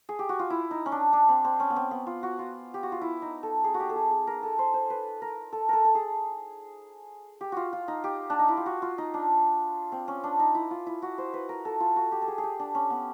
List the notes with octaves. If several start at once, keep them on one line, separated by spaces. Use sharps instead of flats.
G#4
G4
F#4
F4
E4
D#4
C#4
D4
D4
C4
C4
C#4
B3
C4
B3
F4
F#4
F4
G4
F#4
F4
E4
D#4
A4
G#4
F#4
G4
A4
G#4
G#4
A#4
A4
C5
C5
B4
A#4
A4
A4 A#4
A4
G#4
G4
F4 F#4
F4
D#4
G4
D4
D#4
E4
F4
F#4
F4
D#4
D4
C4
C#4
D4
D#4
E4
F4
E4
F#4
C5
B4
A#4
A4
F4
F#4
G4
A4
G#4
G#4
G4
D4
C#4
B3